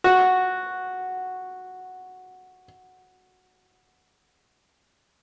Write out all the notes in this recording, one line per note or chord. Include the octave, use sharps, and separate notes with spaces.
F#4